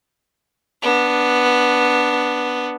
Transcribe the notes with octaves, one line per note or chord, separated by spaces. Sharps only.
B3 D4